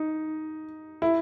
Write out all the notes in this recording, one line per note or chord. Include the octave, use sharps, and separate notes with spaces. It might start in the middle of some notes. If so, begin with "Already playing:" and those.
Already playing: D#4
E4